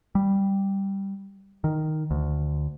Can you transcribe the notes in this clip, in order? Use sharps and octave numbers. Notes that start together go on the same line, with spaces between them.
G3
D#3
D2